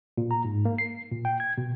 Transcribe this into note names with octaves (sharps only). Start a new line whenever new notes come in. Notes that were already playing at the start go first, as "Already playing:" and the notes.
A#2
A#5
G#2
A#3
C7
A#2
G5
G#6
B2